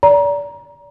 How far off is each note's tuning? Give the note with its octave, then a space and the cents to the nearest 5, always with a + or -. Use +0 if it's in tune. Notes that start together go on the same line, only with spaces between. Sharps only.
D5 -30 A#5 +25